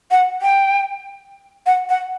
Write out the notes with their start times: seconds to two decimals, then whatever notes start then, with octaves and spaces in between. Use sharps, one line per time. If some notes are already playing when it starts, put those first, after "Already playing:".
0.11 F#5
0.42 G5
1.66 F#5
1.89 F#5